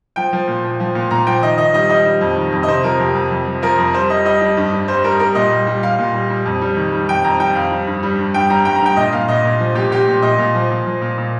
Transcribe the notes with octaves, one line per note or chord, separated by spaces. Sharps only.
F3 G5
F3
A#2
F3
F3
A#2
A#2 A#5
F3 G5
D#3 D#5
D#3 D#5
G3 D#5
G3 D#5
G3
F2
D#3
F2
D#5
C3 C5
F3 A#4
F2 G4
F2
F2
F3
F3 A#4
F2
G3 C5
G3 D#5
G3 D#5
G3
G2
G2
G3 C5
G3 A#4
G3 A#4
A#2 D#5
G3
G3
G3 F5
A#2
G3
G3
F2
G3
D#3
G3
F2 G5
F2 A#5
G3 G5
F2 F5
G3
G2
G3
G2
G2 G5
G3 A#5
G2 G5
A#5
G2 G5
A#2 D#5
A#2 F5
A#2 D#5
A#2
F3
A#2 G4
A#2 G4
A#2
A#2 D#5
A#2
F3
A#2
F3
A#2
A#2